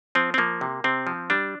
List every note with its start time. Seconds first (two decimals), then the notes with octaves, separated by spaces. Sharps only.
0.15 F3 C4
0.34 C4
0.38 F3 A#3
0.61 C3
0.84 C3 C4
1.07 F3
1.30 G3 D4